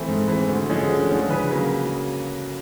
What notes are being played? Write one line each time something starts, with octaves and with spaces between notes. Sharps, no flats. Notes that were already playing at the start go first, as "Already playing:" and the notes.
Already playing: E3 A3 C4
G#2
E3 A3 C4
D2
D3 F3 G#3 C#4
D2
D3 F3 G#3 C#4
C#3 B4
F#3 A#3